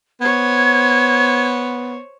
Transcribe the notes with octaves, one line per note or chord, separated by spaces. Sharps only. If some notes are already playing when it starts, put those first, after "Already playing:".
B3 C5 C#5 G#6